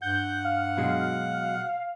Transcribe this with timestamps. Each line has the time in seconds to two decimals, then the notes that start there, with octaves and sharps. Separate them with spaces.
0.02 G2 F#5 G6
0.45 F5
0.77 B2 F#3 G#3